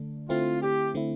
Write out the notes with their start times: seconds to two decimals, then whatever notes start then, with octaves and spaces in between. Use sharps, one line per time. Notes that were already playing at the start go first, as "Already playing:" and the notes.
Already playing: D3 A3 D4
0.29 D3 A3 C4 E4 F4
0.62 G4
0.94 D3 A3 C4 E4